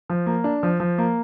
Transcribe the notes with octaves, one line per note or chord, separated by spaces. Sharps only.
F3
A#3
D4
F3
F3
A#3